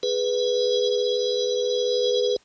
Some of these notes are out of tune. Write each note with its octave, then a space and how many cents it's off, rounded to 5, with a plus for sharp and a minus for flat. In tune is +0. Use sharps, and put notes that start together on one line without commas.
G#4 +0 B4 +0